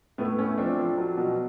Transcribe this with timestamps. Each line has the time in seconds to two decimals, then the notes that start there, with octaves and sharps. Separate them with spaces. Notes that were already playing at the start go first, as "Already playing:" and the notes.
0.18 A2 A3 B3
0.38 A3 B3 C#4
0.58 F3 C4 D4
0.78 F3
0.98 F#3
1.17 B2